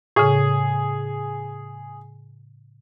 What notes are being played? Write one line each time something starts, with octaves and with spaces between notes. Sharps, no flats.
A2 C#3 G#4